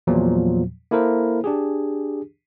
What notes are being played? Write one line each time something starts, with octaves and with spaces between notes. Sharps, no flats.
E2 A#2 F3 F#3
A#3 E4 A4 A#4 C5
D4 G4 G#4